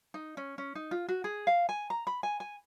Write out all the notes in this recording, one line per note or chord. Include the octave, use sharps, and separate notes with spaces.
D#4
C#4
C#4
D#4
F4
F#4
G#4
F5
G#5
A#5
B5
G#5
G#5